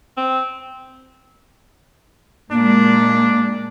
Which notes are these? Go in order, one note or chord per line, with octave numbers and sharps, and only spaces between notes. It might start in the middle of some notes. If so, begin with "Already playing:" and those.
C4
A#2 G#3 A#3 D4